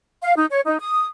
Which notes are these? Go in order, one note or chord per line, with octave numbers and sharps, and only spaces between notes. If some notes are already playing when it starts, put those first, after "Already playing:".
F5
D#4
C#5
D#4
D#6